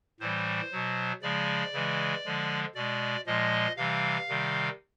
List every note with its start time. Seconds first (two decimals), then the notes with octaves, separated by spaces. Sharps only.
0.20 A2 E3 G3 C5
0.72 B2 F#3
1.22 C#3 F3 G#3 D5
1.73 C#3 E3 G#3
2.25 D3 F3 G#3
2.75 B2 G#3 D5
3.27 A#2 F3 G#3 D#5
3.77 C3 E3 G3 F5
4.29 C3 D#3 G3